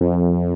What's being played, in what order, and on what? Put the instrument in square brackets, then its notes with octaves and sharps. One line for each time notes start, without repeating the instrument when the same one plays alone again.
[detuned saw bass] F2